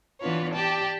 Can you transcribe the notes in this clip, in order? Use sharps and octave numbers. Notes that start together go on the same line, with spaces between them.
E3 B3 D4 F4 B4 C#5
G4 D5 G5 A5